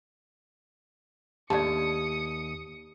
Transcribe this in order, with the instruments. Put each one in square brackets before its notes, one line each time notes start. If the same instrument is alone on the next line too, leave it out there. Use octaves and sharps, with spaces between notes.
[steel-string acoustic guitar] D#2 [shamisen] A3 D4 A5 [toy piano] G4 D5 [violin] D#6 C#7